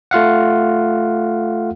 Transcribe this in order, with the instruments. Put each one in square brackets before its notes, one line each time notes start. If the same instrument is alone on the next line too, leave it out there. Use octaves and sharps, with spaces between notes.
[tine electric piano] A3 F4 F5 F#5